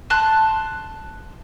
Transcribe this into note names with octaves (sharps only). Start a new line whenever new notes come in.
A5 C6 F#6